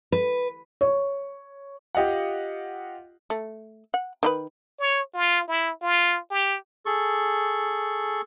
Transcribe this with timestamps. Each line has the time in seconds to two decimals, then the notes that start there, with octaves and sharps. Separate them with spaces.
0.12 B4
0.81 C#5
1.95 F4 G4 D#5 F5 F#5
3.30 A3
3.94 F#5
4.23 D#3 D#4 B4
4.80 C#5
5.14 F4
5.48 E4
5.82 F4
6.31 G4
6.86 G#4 A4 C#6